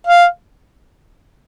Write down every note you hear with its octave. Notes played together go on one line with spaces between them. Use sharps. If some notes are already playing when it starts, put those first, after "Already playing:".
F5